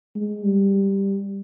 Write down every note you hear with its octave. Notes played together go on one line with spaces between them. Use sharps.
G#3
G3